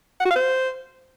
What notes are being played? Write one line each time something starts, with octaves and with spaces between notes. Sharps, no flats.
F#5
F#4
F5
C5